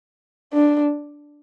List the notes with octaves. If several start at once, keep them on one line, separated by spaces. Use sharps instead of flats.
D4